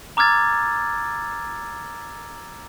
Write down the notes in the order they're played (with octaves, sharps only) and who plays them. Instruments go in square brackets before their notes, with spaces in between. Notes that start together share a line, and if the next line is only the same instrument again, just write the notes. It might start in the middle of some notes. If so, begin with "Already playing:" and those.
[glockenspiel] A#5 D6 E6 F6 G#6 A6